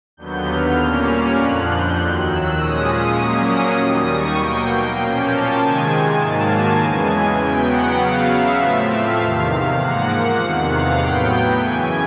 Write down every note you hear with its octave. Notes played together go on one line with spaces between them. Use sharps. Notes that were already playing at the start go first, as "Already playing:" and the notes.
D#2 D3 F#3 B3 G6
F6
A#2 G3 A#3 C#4
F6
F2 D3 F3 F#6
G6
D#2 D#3 F#3 F#6
E6
A#2 F3 G#3 C#4 D#6
A#2 F#3 A#3 C#4
D#6
D#2 D#3 G3
C#6
B2 F#3 A#3 G5
G5
A#2 F3 A#3 C#4
A5
C3 D#3 G#3 G#5
G#5
G#2 D#3 F#3 A#3 A5
G#5
E2 C#3 E3 G#3 G#5
E2 C#3 F#3 B3 G5
F#5
C#3 F#3 B3 F5
E5
A2 F3 A3 C4
F5
E2 C3 D#3
G#2 F3 A#3 F#5
E2 C3 D#3
F5
A2 F#3 B3 G5
F#2 C#3 E3 G#5